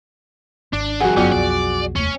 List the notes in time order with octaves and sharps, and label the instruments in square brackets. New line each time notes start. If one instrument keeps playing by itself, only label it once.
[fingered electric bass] G#1 [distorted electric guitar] D4
[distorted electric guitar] C2 F2 [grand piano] F#4 G#4 [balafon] F#5
[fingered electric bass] G1 F#2 [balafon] F#3 B3 F4 [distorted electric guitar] C#4
[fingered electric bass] B1 F2 [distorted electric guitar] D5
[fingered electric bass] F1 D#2 A3 [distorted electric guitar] C#4